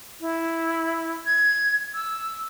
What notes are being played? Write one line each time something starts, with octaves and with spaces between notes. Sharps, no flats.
E4
G#6
E6